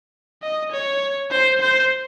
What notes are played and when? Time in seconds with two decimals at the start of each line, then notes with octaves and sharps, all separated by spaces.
0.43 D#5
0.72 C#5
1.32 C5
1.61 C5